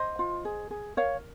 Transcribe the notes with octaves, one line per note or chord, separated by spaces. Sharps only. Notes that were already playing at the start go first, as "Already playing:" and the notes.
Already playing: C5 D#5
F4
G#4
G#4
A#4 C#5 F5